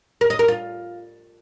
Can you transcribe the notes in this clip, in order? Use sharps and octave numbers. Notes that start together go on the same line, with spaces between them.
A#4
D#5
A#4
F4